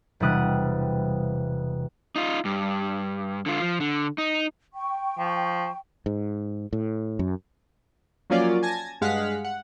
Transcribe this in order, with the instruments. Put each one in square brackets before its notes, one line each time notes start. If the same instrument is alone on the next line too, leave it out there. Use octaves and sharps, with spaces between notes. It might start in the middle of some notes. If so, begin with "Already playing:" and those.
[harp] E1 C3 E3 G3 D#6 F#6
[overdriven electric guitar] D#4 F4
G2
D3 F4
F3
D3
D#4
[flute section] G5 C#6
[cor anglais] F3
[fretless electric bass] G#2
A2
F#2
[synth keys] F3 F#3 A#3 C#4 F4 D5
G#5 A5 G#6 A#6
G2 G#3 F5 F#5 F6 B6
F#5